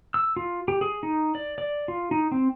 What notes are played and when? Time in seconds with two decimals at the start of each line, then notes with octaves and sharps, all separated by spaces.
0.14 E6
0.37 F4
0.68 G4
0.81 G#4
1.03 D#4
1.35 D5
1.58 D5
1.88 F4
2.11 D#4
2.32 C4